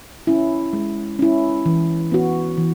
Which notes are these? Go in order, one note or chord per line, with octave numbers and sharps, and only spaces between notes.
C#4 E4
G#3
C#4 E4
E3
B3 F#4
E3